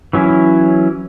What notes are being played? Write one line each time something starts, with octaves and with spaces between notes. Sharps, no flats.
E3 F#3 C#4 E4